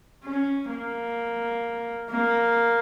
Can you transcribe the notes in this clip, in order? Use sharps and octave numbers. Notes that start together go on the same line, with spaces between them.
C#4
A#3
A#3